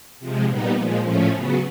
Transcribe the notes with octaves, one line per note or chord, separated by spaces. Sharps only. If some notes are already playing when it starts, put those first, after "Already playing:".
C3 F3 G#3
A#2 G3 B3 D#4
A#2 F3 G#3
A2 F3 A3 C#4
C#3 F#3 B3